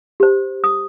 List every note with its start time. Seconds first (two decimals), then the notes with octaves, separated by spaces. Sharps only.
0.20 G4 C5
0.64 D#6